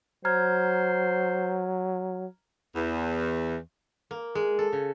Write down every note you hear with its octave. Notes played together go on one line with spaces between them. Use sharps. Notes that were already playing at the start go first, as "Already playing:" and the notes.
F#3 C5 A#5 F6 G#6
E2
A#3
G#3
A4
C#3